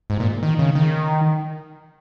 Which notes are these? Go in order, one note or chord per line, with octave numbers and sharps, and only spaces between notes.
G#2
A#2
D#3
C#3
D#3